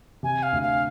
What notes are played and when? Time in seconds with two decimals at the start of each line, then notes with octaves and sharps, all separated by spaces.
0.23 C3 G#5
0.43 F5
0.53 D2
0.62 F5